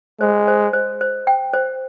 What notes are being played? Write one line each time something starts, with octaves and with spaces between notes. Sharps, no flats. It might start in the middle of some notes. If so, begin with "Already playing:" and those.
G#3 C5
C5
C5
C5
G5
C5